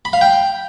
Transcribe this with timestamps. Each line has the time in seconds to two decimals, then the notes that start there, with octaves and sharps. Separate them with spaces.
0.05 B5
0.13 F5
0.21 G5